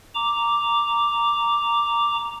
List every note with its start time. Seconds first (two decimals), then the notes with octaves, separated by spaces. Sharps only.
0.15 A#5 D6